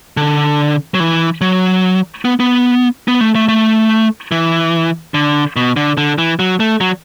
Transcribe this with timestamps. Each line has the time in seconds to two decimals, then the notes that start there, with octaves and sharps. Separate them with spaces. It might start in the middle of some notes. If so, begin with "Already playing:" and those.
0.17 D3
0.94 F#3
1.00 E3
1.41 F#3
2.25 B3
2.40 B3
3.08 B3
3.21 A3
3.35 A3
3.48 A3
4.31 E3
5.14 D3
5.56 B2
5.76 D3
5.97 D3
6.18 E3
6.39 F#3
6.60 A3
6.80 F#3